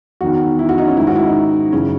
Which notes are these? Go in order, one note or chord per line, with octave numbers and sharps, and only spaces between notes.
E2 D#3 F#4
E4
F#4
D#4
C#4
G#2 D#3 E4
F#4
E4
D#4
F#2 C#3 E3 C#4